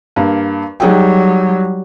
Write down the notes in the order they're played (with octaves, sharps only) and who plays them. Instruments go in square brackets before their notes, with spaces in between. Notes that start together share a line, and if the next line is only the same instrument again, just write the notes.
[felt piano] G2 A#3
[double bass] F#3 G3 [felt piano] D#4 G#4 G5